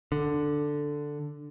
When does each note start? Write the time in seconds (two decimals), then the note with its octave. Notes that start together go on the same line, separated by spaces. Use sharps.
0.12 D3